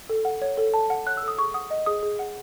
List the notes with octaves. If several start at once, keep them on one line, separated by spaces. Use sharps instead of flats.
A4
F#5
C#5
A4
A4 A5
F#5
C#5 F#6
E6
A4
D#6
G#4 C#6
F#5 D#6
D#5
G#4 D#6
G#4
F#5